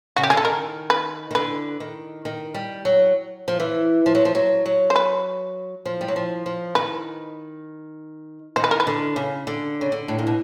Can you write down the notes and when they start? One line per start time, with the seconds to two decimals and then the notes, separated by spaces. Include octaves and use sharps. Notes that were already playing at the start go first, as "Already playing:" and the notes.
0.16 C#3 F#4
0.23 G4
0.30 D3 G#4
0.37 A4
0.45 D#3 A#4
0.90 B4
1.31 D#3
1.35 D3 B4
1.80 D#3
2.25 D#3
2.54 G3
2.85 F#3
3.48 F3
3.60 E3
4.06 F3
4.15 F#3
4.25 F3
4.35 F#3
4.66 F#3
4.90 C5
4.96 B4
5.85 F3
6.01 G3
6.08 F#3
6.16 F3
6.46 F3
6.75 D#3 B4
8.56 D#3 C5
8.64 B4
8.71 A#4
8.80 B4
8.87 D3
9.16 C#3
9.47 D3
9.81 C#3
9.92 D3
10.08 A2
10.18 A#2
10.27 B2